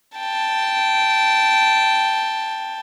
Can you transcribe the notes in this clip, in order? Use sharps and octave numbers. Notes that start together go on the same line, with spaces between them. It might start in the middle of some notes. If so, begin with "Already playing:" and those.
G5 A5